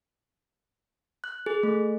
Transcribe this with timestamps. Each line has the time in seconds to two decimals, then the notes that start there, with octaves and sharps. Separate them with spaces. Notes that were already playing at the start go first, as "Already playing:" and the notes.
1.24 F#6
1.46 G#4
1.63 A3